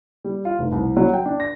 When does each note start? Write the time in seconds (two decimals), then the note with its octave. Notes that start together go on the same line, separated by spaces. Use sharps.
0.24 G3
0.45 F4
0.59 F1
0.72 C2
0.97 F#3
1.14 G5
1.26 D4
1.40 A#6